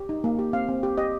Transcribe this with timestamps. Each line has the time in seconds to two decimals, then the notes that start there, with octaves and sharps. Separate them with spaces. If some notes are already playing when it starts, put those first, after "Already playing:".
Already playing: G4
0.09 D#4
0.24 A#3
0.39 G4
0.53 C4 F5
0.68 C4
0.83 G4
0.98 G4 D#5